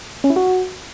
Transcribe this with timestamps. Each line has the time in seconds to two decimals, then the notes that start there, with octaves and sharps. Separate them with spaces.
0.24 C#4
0.30 E4
0.36 F#4